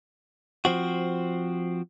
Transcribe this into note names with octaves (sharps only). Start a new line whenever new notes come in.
F3 C4 F#4